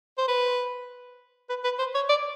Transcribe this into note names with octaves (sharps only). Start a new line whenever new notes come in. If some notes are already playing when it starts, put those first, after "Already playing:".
C5
B4
B4
B4
C5
C#5
D5